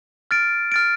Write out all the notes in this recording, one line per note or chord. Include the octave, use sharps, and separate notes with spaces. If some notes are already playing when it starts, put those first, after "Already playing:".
F6 A6 D7
F6 A6 D7